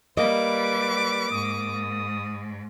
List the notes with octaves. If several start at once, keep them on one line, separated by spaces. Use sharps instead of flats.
G3 A#3 B4 D#5 D6
G#2 D#6